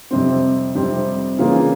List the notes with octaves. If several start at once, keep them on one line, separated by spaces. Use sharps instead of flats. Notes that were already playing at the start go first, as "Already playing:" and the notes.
F2 C3 G3 C4
F2 C3 G3 C4
C#3 E3 A#3 F4 G#4